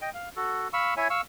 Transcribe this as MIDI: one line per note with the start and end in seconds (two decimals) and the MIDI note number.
0.02 0.10 75
0.02 0.10 79
0.14 0.29 77
0.36 0.68 66
0.36 0.68 69
0.73 0.94 77
0.73 0.94 83
0.73 0.94 85
0.73 0.94 88
0.97 1.08 64
0.97 1.08 73
0.97 1.08 76
0.97 1.08 80
1.10 1.21 77
1.10 1.21 85
1.10 1.21 88